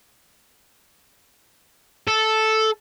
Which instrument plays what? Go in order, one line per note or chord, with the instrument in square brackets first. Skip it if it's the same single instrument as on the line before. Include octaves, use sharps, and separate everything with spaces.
[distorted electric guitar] A4